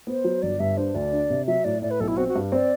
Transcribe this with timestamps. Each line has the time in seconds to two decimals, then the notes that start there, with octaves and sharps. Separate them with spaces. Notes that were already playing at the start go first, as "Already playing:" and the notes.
0.07 B3 C5
0.24 F#3
0.42 G1 D5
0.60 G2 E5
0.77 D4 C5
0.94 D2 D5
1.12 D4
1.30 C3
1.47 F#3 E5
1.64 A2 D5
1.82 A2 D5
1.91 B4
2.00 B1 A4
2.08 E4
2.17 C4 F#4
2.28 F#4
2.35 G2
2.52 C4 D5